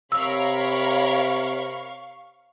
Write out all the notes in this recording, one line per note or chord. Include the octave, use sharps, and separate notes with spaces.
C3 A#4 C#5 F5 B5 C#6 E6